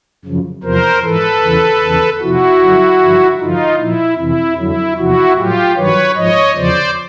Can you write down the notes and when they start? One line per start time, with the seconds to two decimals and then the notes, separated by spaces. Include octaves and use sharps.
0.25 F#2 C#3 F3
0.63 E2 C3 F3 A#4 C5
1.03 G#2 E3 A4 B4
1.42 E2 C#3 E3
1.83 E2 C#3 E3
2.21 F2 C3 F3 E4 F#4
2.61 F#2 D3 F#3
3.01 G2 D3 F3
3.39 G2 D3 F3 D#4 F4
3.79 A#2 F3 E4
4.18 F2 C3 E3 E4
4.58 F2 D3 F#3 E4
4.97 E2 C3 F3 E4 F#4
5.36 A2 F#3 F4 G4
5.76 G2 D#3 F#3 B4 C#5
6.15 G#2 F3 C#5 D#5
6.55 E2 C#3 F3 C5 D5